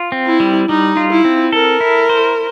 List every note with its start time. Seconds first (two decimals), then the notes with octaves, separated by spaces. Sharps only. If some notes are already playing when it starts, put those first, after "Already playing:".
Already playing: F4
0.12 C4
0.26 E4
0.40 G3
0.69 G3 D#4
0.97 F4
1.11 E4
1.25 C4
1.52 A4 A#4
1.81 E4
2.09 C5